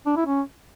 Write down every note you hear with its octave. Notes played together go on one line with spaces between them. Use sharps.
D4
E4
C#4